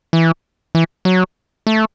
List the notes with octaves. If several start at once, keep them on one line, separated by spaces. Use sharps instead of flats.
E3
E3
F#3
A3